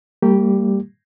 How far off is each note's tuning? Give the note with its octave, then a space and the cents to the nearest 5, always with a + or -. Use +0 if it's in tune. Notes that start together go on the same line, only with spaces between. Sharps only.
G3 +0 A#3 -35 G4 +0